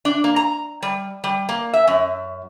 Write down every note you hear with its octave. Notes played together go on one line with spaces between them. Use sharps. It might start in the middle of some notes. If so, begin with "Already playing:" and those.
D4
A#3
A#5
G3
G3
A#3
E5
F#2